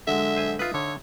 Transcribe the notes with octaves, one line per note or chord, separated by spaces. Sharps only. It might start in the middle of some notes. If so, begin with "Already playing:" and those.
D3 F#3 G#3 E5
C5 G#5
D#4 F4 B4 E5
D3 C#5